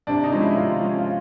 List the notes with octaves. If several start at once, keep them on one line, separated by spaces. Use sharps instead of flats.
C3 D4
D#4
F3 G#3 C#4
E4
C3 F4
F3 G#3 C#4
F4